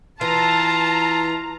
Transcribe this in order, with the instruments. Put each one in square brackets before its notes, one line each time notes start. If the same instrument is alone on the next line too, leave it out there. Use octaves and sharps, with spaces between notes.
[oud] E3 [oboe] F4 [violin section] A5 [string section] A#5